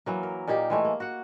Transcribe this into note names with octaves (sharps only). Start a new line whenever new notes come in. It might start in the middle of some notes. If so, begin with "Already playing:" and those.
E3 F#3 A#3
A#4
A#2 A#3 D#4 G4
E3 G#3 A3
A#3
F#4 F#5